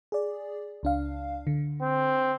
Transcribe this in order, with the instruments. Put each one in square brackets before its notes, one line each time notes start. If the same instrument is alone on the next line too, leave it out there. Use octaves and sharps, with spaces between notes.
[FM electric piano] G#4 D5
C#2 D4 F5
D3
[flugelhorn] C4